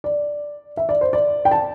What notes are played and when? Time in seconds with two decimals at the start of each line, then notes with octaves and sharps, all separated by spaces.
0.04 D5
0.77 E5
0.89 D5
1.01 C5
1.13 D5
1.45 G5
1.51 A5